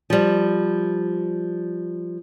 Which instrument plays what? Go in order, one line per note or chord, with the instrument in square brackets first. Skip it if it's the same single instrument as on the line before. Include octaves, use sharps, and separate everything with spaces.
[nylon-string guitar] F3 G3